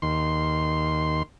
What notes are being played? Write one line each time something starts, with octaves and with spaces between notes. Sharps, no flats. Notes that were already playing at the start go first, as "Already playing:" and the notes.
D#2 C6